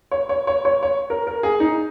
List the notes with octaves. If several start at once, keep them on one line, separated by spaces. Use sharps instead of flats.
C#5
C#5
C#5
C#5
C#5
A#4
A#4
G#4
D#4